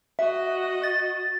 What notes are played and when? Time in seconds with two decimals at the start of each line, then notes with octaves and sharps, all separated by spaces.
0.19 F#4 D#5 E5
0.83 A6